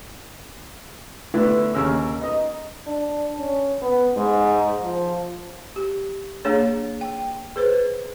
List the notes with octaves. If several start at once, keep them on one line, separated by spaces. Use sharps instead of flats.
D3 A3 B3 D4 E4
D#2 C#3 C#4 A#4 E6
B2 D#4 D#5
D4
C#4
B3
G#2
F3
G4
A#3 D4 G#4 C#5
G5
G#4 B4 C5